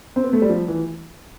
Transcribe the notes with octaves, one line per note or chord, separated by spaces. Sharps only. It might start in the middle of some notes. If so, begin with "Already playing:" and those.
C4
B3
A3
G3
F3
E3